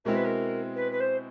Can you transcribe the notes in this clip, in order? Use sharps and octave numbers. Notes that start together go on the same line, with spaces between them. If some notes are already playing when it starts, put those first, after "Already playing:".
B2 G#3 C4 E4 A#4
B4
A#4
B4
B4
C5